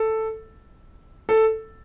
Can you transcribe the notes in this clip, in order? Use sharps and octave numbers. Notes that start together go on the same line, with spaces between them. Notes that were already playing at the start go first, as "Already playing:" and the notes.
Already playing: A4
A4